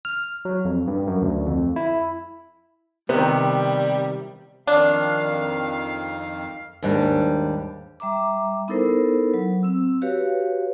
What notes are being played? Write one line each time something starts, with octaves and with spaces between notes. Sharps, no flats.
F6
F#3
F2
G2
F#2
D2
F2
E4
C3 D#3 G3 B3
F2 D#3 D4 F5
D#2 G#2 G3 D4
G3 E5 A#5 D6
B3 D#4 E4 A4 A#4 C5
F#3
C4 E6
F#4 G4 B4 C#5 F5